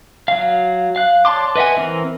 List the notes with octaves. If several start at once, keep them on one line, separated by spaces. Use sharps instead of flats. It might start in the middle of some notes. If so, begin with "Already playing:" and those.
F#3 F5
F5 F#6
C#5 D5 A5 C6 D6
B4 D#5 E5 F#5 G#5
E3 C4 A#4